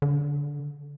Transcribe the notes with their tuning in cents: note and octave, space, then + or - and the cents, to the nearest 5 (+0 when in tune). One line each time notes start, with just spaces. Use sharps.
D3 -15